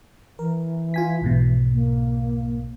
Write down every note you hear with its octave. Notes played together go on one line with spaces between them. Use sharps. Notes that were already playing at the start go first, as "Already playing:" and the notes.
E3 A#4
F4 G#5 B6
B1 G#2 B2
A#3